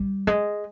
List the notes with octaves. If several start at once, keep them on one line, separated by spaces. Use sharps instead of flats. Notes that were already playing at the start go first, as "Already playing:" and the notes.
Already playing: G3
G#3